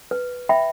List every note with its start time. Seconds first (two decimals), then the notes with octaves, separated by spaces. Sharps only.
0.11 B4
0.49 E5 G5 B5